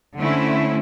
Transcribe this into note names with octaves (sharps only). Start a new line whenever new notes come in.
D3 A3 C4 C#4 E4